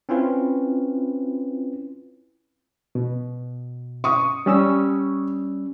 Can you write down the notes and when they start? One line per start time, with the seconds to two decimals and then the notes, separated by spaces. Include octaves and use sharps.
0.09 C4 C#4 E4 F4 B4
2.95 B2
4.04 C#6 D#6
4.46 G3 C#4 E6